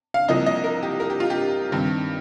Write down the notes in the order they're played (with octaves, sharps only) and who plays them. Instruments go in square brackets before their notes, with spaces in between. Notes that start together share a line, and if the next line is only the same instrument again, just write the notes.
[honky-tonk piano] F5
C2 C3 F3 A#3 D#5
D#5
A#4
G4
A#4
G4
F4
G4
G2 D#3 C4